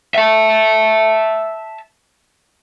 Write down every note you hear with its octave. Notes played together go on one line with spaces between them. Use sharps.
E5 A5